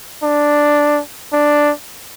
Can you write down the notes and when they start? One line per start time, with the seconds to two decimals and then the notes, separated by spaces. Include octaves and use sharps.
0.23 D4
1.33 D4